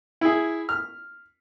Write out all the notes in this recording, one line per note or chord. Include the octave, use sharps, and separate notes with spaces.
E4 G#4
F6